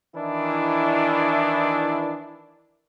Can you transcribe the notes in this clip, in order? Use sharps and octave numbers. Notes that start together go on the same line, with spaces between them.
D#3 E3 D4 E4